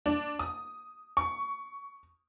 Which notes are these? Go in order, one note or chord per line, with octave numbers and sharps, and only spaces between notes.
D4
D#6
C#6